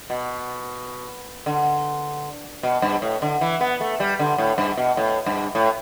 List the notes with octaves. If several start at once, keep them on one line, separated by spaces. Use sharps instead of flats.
B2
D3
B2
G2
A2
D3
E3
B3
A3
G3
D3
A2
G2
B2
A2
G2
A2